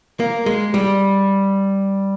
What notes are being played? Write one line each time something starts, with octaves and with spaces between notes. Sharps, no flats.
A#3
G#3
G3